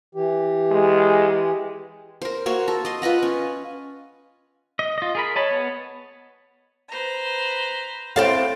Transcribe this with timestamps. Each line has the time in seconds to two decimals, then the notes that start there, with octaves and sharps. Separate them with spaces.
0.15 E3 G4
0.71 G#3
2.22 A#4 C5
2.46 A#3 F#4 C5 C#5
2.68 A4
2.85 D#5 C6
3.02 F4 B4 D#5 F#5
3.23 C#4
4.79 D#5
4.98 F4 D#5
5.15 G#4 A#4 B5
5.36 C#5 D#5 A5 B5
5.51 B3
6.88 B4 C5 A#5
8.16 A2 C4 A4 F5